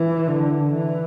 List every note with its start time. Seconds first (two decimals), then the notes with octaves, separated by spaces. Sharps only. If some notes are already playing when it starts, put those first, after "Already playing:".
Already playing: E3
0.28 D3
0.73 E3